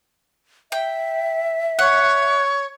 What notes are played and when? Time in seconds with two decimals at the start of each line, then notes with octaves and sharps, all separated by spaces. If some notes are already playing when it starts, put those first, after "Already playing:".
0.72 E5 G5
1.79 C#5 F#5